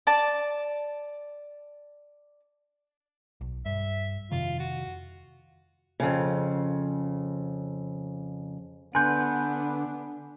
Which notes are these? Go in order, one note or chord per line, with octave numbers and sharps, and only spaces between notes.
D5 A5
B1
G2 E5
F2 C3 D#3 F4
F#4
F2 C#3
D3 B3 D4 B4 G#5 C6 G6